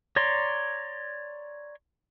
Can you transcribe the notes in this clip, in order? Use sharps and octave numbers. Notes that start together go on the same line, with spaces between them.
C#5 D5 A#5 C6